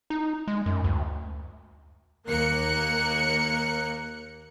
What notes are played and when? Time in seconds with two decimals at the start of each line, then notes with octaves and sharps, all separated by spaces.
0.10 D#4
0.48 G#3
0.66 F#2
0.84 D2
2.26 D#2 A#3 A#4 F#6 C#7